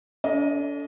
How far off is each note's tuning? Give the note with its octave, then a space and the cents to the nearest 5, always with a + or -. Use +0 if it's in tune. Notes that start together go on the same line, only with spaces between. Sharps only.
D4 -45 A4 +0 D#5 +0